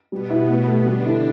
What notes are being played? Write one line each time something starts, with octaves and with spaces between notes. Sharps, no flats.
B2 G3 B3
E4 G4
A2
A3
G4
D3 G3 D4
E4 A4